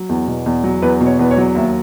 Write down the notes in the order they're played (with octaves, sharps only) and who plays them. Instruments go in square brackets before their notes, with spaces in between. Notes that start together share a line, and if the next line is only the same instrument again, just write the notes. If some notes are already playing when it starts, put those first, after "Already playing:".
Already playing: [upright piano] F#3
E2
B2
E2
F#3
E2 B4
B2
C#5
E2 B4
C#5
F#3
D#2 E5